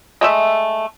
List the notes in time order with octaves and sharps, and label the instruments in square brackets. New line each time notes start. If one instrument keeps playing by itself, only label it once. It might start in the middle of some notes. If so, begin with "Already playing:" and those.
[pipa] G#3 A3 E5